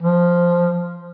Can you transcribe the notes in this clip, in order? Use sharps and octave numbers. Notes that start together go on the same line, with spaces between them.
F3